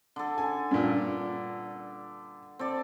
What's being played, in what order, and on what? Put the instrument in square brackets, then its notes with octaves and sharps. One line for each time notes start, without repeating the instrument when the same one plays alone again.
[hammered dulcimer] D3 A4
[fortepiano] G#5
G2 A#2
[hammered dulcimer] C4 A4 D5